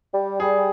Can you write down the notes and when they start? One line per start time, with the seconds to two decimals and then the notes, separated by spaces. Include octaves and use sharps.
0.14 G3
0.40 G3 G#4